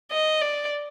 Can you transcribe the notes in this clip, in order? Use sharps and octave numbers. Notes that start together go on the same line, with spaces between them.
D#5
D5